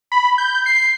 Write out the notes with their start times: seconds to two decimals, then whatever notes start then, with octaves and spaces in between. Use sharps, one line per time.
0.12 B5
0.38 G6
0.66 C7